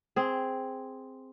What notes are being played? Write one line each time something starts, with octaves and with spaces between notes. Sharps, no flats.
C4 G#4